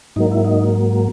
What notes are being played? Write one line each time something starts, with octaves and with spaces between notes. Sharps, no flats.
G#2 F#3 A#3 D#4
E4
D#4